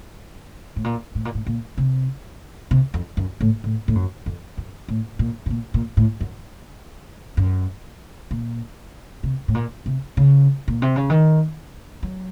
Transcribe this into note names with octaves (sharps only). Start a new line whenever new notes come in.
A2
A#2
A2
A#2
A2
A#2
C3
C3
F2
F#2
A2
A2
A2
F#2
F2
F#2
A2
A#2
A2
A#2
A#2
A2
F#2
F#2
A#2
C3
A2
A#2
C3
C#3
A#2
C3
C#3
D#3
F#3